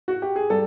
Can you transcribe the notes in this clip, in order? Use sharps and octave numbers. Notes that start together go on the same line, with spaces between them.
F#4
G4
G#4
G3 A4